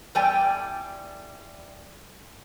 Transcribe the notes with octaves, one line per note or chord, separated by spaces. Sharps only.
E2 G3 A4 D5 G5 G#5